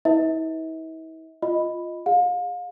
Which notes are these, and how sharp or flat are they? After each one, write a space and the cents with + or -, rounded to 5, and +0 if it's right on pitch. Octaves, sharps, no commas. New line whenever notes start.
E4 -45 B4 +0 E5 -45
F4 +0 D#5 +0 B5 +0
G#4 -25 F5 +35